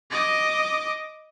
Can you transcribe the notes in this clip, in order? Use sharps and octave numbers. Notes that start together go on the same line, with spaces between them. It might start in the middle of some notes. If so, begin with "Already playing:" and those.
D#5 D6